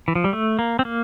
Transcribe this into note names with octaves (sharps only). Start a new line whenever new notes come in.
E3
F3
G3
A3
A#3
C4
A#3